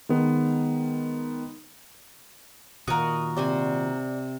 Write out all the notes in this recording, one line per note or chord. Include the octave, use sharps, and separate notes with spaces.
D#3 G#3 B3
A#2 D#3 F#4 A#4 D#6
C3 C5 D5 G#5